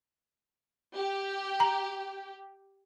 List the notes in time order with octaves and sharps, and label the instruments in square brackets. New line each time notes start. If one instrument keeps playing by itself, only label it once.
[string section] G4
[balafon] A#5